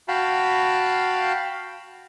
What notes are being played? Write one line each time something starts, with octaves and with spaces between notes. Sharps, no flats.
F#4 F5 G5 A5 B5